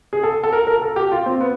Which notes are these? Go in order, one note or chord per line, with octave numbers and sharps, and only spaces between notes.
G#4
A4
A4
A#4
A#4
A4
G4
F4
C4
B3